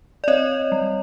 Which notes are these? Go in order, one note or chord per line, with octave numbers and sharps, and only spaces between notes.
D5
C4 C#5 D#5
G3